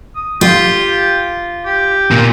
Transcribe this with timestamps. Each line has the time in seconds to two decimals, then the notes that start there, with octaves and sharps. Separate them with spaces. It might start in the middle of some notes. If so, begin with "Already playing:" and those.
0.15 D#6
0.41 F4 G4
1.65 G4
2.11 A#2